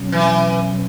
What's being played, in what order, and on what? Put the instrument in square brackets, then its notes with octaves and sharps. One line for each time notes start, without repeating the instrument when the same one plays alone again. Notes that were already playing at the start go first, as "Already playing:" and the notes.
Already playing: [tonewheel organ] B2 F#3 C#4
[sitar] E3